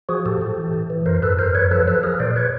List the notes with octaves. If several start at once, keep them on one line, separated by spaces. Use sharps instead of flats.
F3 F#4 G#4
A2 G4 A4
A2
E3
A2
E3
F#2 A#4 C5
F#2 A4 B4
F#2 A#4 C5
F#2 B4 C#5
F3 A4 B4
F3 A4 B4
F3 G#4 A#4
A#2 C5 D5
B4 C#5